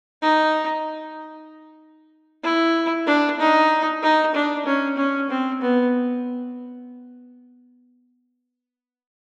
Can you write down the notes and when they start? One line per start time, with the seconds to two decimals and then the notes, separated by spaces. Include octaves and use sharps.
0.22 D#4
2.44 E4
3.07 D4
3.40 D#4
4.02 D#4
4.35 D4
4.66 C#4
4.97 C#4
5.30 C4
5.61 B3